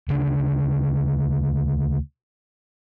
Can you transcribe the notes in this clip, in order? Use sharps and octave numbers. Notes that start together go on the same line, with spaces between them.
D2 C#3 D4